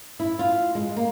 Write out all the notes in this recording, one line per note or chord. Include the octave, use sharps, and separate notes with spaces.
E4
F4
G#3
A#3